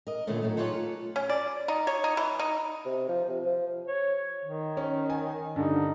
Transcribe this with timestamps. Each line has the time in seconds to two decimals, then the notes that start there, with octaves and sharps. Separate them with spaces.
0.07 A#4 D#5
0.27 A#2 D3 D#3 A3 B3 C#4
0.42 A2 F#3 D#4 A4
0.57 D#4 F4 G4 G#4 B4 C#5
0.72 F4 A4
1.16 C#4
1.29 D5
1.68 D#4
1.87 C#5
2.04 D#4
2.17 E3
2.39 D#4
2.86 C3
3.09 F3
3.28 C3
3.46 F3
3.88 C#5
4.45 D#3
4.77 C#4
5.10 G#5
5.56 G2 D3 D#4